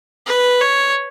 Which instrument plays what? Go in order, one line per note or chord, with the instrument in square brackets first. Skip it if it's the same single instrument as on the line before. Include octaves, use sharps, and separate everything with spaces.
[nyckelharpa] B4
C#5